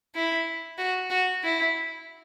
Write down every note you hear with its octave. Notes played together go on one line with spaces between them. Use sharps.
E4
F#4
F#4
E4